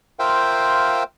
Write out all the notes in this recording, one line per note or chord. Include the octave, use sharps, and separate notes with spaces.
F4 A#4 C5 E5 F5 G5